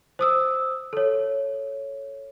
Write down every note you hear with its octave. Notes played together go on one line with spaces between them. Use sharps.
C5 D#6 E6
A4 C#5